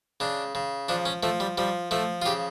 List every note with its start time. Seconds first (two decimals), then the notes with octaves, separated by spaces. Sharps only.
0.20 C#3 D4
0.55 C#3
0.89 F3 D4
1.06 C#4
1.23 F3 A3
1.40 G3
1.58 F3 G3
1.91 F3 A3
2.22 F4
2.26 C#3 G4